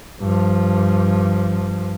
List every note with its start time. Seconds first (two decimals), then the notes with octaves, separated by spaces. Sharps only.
0.20 G2 F3